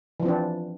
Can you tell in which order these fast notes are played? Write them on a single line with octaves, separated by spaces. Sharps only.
E3 F3 C4 D4